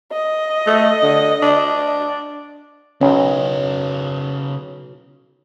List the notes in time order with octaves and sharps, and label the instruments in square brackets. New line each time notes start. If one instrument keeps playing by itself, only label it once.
[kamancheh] D#5
[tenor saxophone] A3
D3
D4
[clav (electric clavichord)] B1 [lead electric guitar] C#3 A#4 [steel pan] C#4